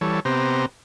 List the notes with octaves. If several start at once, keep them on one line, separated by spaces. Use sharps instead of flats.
E3 G3 A4 C#5
C3 B3 G4 C5 A#5